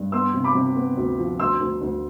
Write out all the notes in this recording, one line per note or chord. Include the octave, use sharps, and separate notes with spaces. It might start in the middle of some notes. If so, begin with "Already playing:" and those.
Already playing: G2
B3 C6 E6
C3
B5 D6
C3
B3
D2
F3
D2 C6 E6
D2
D2